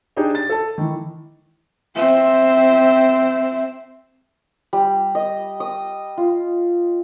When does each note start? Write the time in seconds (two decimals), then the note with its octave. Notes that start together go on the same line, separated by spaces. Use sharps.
0.17 D4 D#4 G4 G#4
0.35 A6
0.50 A4 A5
0.78 D#3 E3
1.95 C4 E5
4.73 G3
5.15 D#5
5.60 D#6
6.17 F4